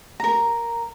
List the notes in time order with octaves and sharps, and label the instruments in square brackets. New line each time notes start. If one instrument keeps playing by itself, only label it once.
[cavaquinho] A#4 A#5